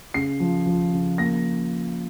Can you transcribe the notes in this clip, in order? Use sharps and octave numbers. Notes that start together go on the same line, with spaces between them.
C#3 C7
F3
F3
C#3
A#3 A#6